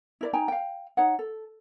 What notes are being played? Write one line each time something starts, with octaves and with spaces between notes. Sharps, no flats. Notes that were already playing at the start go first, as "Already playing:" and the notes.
E4 A#4 D5
D#4 G5 G#5 A#5
F5 G5
D#4 C#5 F#5
A4